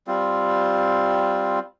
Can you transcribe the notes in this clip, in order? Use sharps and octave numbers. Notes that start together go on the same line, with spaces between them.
G3 C4 F4